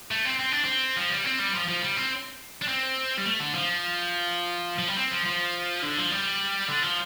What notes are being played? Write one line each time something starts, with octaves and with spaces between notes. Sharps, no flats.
A3
C4
C4
D4
C4
F3
G3
C4
G3
F3
F3
G3
C4
D4
C4
G3
A3
D3
F3
F3
G3
C4
F3
F3
D3
F3
G3
D3
F3